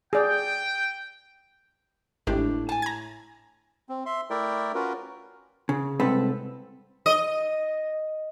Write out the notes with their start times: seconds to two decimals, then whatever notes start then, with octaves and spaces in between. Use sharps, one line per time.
0.13 G#4 D5 G5
2.27 G#1 A2 D4 G4
2.69 G#5 A5
2.82 A#5 G#6
3.89 C4
4.06 E5 C6
4.30 A3 E4 A#4 D5 E5 G5
4.75 C#4 F4 F#4 A#4 B4
5.69 C#3
6.00 C2 G#2 C4 A4 B4
7.06 D#5